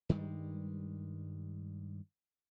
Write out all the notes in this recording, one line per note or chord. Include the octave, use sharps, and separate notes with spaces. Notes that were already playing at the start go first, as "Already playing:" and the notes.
G2 D#3 G3 G#3